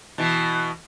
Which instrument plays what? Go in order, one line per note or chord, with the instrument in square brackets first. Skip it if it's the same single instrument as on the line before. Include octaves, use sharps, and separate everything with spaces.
[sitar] B2 E3